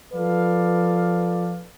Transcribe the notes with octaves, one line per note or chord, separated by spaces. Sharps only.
F3 A4 B4 D5 F5